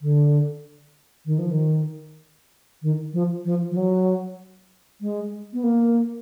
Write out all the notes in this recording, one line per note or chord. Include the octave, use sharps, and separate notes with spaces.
D3
D#3
F3
D#3
D#3
F3
F3
F3
F#3
G#3
B3
A#3